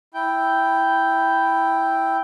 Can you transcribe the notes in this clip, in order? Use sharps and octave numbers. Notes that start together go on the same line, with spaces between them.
E4 G5